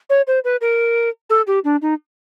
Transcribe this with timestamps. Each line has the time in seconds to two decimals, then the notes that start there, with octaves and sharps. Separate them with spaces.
0.10 C#5
0.27 C5
0.44 B4
0.61 A#4
1.30 A4
1.47 G4
1.64 D4
1.82 D#4